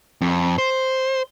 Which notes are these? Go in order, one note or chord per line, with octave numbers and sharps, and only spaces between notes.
F2
C5